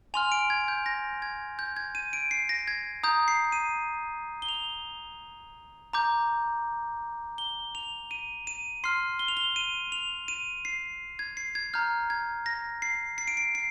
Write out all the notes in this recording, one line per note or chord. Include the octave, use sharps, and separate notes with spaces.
G#5 C6 F6 F7
D7
G#6
G6
A#6
G#6
G6
G#6
D#7
D7
C7
A#6
G#6
A#5 D#6 G6
C7
D#7
G7
F7
A#5 D6 G6
G7
F7
D#7
D#7
C6 F6 C7
G7
F7
G7
D#7
F7
D#7
C7
G#6
C7
G#6
A#5 F6 G6
G#6
A#6
C7
C7
D7
C7
C7